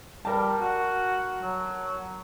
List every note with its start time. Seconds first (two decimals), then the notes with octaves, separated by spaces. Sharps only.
0.25 G3 A#4 A5
0.60 F#4
1.42 F#3